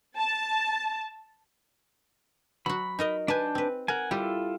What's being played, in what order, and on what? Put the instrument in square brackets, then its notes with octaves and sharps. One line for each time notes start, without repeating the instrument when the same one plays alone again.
[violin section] A5
[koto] F#3 F#4 [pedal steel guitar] B5
[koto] D#4 A#4 D#5
[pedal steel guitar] D4 A5 G6 [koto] B4 G#5
[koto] C4 B4
[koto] A#4 [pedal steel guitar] F#5 G#5
[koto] G3 G4 [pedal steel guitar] E4 F4 A4